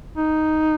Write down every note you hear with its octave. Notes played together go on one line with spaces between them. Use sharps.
D#4